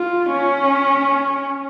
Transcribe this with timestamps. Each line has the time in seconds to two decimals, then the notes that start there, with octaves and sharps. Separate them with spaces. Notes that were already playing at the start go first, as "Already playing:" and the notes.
Already playing: F4
0.30 C#4